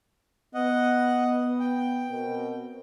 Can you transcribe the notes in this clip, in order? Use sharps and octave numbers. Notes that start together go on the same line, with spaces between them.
B3 D#5 F#5
G5
B2 C4 A#4